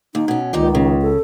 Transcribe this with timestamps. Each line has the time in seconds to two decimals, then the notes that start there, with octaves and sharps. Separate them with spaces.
0.15 D#2 D#4
0.28 B2 C#4
0.53 C#2 A#2 D#3 D#4 G4
0.75 C#3
1.02 A4